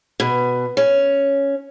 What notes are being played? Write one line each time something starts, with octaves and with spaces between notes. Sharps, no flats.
B2
C#4